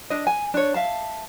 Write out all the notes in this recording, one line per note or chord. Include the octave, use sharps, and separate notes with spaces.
D4 D#5
G#5
D4 C#5
E5 F5 A5